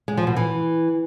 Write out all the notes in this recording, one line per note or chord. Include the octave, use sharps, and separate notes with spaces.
G#3
F3
B2
E3